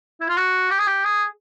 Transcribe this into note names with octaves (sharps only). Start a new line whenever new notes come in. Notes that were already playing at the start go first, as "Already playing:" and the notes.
E4
F4
F#4
G4
G#4
G4
G#4